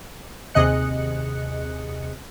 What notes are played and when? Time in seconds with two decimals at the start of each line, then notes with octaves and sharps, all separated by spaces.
0.54 D#2 C3 G#4 D#5 F#6 C#7